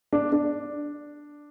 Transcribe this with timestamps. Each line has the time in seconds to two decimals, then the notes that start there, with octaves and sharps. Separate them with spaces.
0.13 D4
0.32 D4